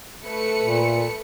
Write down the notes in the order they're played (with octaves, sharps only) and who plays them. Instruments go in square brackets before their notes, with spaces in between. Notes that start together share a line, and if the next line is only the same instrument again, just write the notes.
[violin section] A3 B4 C#7
[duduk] A#2